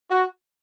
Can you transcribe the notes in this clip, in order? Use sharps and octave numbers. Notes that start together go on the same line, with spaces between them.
F#4